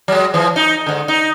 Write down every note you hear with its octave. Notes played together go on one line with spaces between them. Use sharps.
F#3 G#3
E3 F3
D#4
G#2 D3
D#4